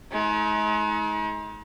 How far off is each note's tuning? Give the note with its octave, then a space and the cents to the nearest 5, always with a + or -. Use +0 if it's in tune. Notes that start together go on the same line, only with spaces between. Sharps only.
G#3 +40 D#4 +40